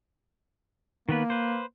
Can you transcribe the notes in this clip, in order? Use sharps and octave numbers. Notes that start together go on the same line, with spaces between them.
D#3 A#3 B3 B4
B4 C5